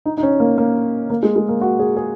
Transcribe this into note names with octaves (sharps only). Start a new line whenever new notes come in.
D#4
D#4
C#4
A#3
A#3
A#3
G#3
G#3
A#3
F#4
G#4
G#4